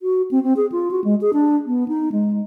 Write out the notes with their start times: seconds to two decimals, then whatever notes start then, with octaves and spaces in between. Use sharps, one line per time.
0.02 F#4
0.31 C4
0.43 C4
0.57 G#4
0.72 F4
0.91 F#4
1.04 G#3
1.21 G#4
1.33 D4
1.66 B3
1.88 D#4
2.12 G#3